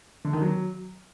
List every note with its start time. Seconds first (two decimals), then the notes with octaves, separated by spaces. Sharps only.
0.25 D3
0.33 D#3
0.42 F#3